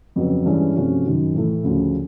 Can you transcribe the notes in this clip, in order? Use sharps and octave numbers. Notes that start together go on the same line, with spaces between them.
F2 C#3 F#3 B3
G2 E3 G#3 C#4 E4
C3 F3 A3 C#4 F#4
F#2 D#3 F#3
A2 E3 A3
D2 C#3 F3